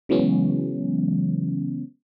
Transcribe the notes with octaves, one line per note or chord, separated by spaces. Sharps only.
C#3 E3 F#3 G#3 B3 C#4